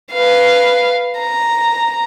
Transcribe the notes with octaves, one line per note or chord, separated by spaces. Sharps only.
B4 F5
A#5